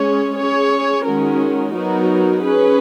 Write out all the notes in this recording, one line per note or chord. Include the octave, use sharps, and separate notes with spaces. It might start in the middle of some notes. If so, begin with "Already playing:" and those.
Already playing: G#3 C#4 G#4 C#5
C#4 G#4 C#5
D#3 G#3 C#4 F#4 A#4
F#3 B3 D#4 F#4 A#4
C#4 G#4 B4